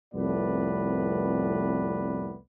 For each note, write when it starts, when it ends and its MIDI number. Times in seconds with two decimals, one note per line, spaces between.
0.14 2.36 36
0.14 2.36 41
0.14 2.36 45
0.14 2.36 59
0.14 2.36 71
0.14 2.36 74